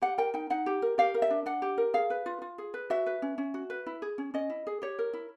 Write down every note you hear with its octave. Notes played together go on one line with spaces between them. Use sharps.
G4 F#5
A#4 G5
D#4 G5
D#4 F#5
G4
A#4
G4 F5
A#4
E5
D4
D4 F#5
G4
A#4
G#4 F5
B4
F4
F4
G#4
B4
F#4 E5
B4
C#4
C#4
F#4
B4
E4
G#4
C#4
C#4 D#5
E4
G#4
G4 C#5
A#4
E4